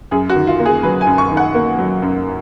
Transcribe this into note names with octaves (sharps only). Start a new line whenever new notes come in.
F#2 G#4
F#4
D#3
F4
A#3
G#4
F#3 B4
G#5
F#2
C#6
D#3
F#5
A#3
F#3
F#2